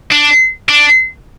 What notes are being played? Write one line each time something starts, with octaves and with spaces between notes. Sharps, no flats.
D4
D4